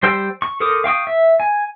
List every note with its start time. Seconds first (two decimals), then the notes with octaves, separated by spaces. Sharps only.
0.03 G3 C5 G5 E6
0.42 C#6
0.60 A4 A#4 C5 D6 D#6
0.84 F5 G5 C#6 D#6
1.07 E5
1.40 G#5